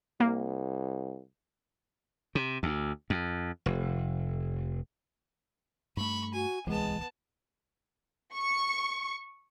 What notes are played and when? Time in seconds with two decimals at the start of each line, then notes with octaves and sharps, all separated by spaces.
0.20 C2 A#3
2.35 C3
2.63 D2
3.10 F2
3.66 F1
5.97 G2 A3 B5 C#6
6.34 F#4 G#5
6.67 D1 C2 E3 G#3 B3 A5
8.35 C#6